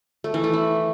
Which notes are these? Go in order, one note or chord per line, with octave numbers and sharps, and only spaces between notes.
A3
E3
A3
E4